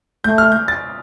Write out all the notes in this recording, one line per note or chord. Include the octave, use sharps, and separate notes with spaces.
A3 G6
F6
G6
A6